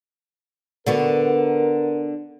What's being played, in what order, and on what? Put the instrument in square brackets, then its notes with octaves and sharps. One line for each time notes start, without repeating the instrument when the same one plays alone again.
[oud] D3 B3 F#4 [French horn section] A#4